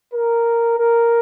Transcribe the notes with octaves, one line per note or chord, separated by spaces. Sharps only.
A#4
A#4